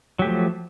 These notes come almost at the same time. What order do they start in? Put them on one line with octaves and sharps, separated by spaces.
F#3 G4 A3 F3